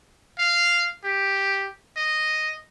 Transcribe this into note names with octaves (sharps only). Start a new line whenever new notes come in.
F5
G4
D#5